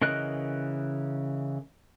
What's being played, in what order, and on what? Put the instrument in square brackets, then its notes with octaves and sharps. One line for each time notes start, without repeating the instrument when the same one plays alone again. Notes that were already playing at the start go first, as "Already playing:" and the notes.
[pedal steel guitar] C#3 E3 A#4 D#5 F#6